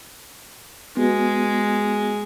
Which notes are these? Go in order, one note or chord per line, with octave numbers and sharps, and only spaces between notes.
G#3 B3 F#4